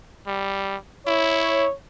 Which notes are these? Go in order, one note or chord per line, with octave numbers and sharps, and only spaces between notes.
G3
E4 C#5